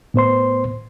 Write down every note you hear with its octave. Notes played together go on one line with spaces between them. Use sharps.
A2 B3 C5 C6